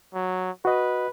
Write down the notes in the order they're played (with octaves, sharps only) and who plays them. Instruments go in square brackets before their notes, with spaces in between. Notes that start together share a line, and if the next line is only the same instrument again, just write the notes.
[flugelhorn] F#3
[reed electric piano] F#4 D#5 [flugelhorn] B4